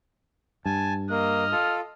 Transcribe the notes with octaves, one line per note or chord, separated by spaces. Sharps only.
G2 G#5 A5
A#3 D#5 F6
F4 A4